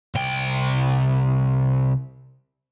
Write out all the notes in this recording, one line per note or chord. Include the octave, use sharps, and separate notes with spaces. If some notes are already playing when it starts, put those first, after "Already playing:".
C2 G5